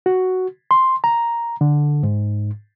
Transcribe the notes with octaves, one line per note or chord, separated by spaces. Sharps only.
F#4
C6
A#5
D3
G#2